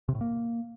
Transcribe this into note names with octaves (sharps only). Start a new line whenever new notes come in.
C3
A2
A#3